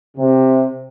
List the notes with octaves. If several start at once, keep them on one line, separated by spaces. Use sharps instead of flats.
C3